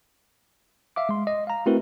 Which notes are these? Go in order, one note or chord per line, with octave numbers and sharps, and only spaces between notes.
E5 F5 D6
G#3 C6
D#5
F5 A#5
A3 C4 E4 F#4 A#4 B4